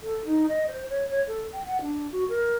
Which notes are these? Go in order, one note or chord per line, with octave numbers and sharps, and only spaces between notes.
A4
D#4
D#5
C5
C#5
C#5
A4
G5
F#5
D4
F#4
A#4